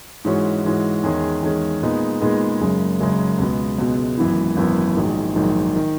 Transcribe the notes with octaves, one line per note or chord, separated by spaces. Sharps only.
G#2 E3 G#3 C#4 F#4
G#2 E3 G#3 C#4 F#4
E2 D#3 G#3 C#4 G#4
E2 D#3 G#3 C#4 G#4
A#2 G#3 B3 D#4 G#4
A#2 G#3 B3 D#4 G#4
F#1 F#2 C#3 G#3
F#1 F#2 C#3 G#3
C#2 B2 G#3 B3
C#2 B2 G#3 B3
G#1 F#2 E3 B3 E4
G#1 F#2 E3 B3 E4
A#1 G#2 D#3 F#3
A#1 G#2 D#3 F#3
D#3